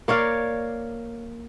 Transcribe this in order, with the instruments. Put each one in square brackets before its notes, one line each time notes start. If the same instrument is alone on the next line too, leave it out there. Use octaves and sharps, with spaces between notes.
[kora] A#3 C#5 D5 F5